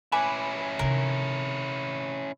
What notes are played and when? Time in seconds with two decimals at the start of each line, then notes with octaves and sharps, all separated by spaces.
0.12 C#4 E4 B4 G#5 D6
0.79 C3 D#3 A#4